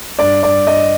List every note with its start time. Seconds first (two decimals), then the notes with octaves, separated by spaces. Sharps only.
0.19 G2 D5
0.43 G2 D5
0.67 G2 D#5